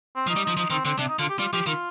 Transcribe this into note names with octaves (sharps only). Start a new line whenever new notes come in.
C4
F3
D#4
G3
F3 D#4
F3 D#4
D#3 C4
D3 C4
C3 D4
D#4
D3 F4
G4
G3 F4
F3 G4
D#3 F4